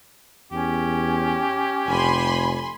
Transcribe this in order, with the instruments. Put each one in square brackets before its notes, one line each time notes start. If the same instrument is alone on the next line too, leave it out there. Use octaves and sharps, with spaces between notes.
[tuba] E2 [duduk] C#4 [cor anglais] G4
[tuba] F1 [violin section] G#5 B5 C6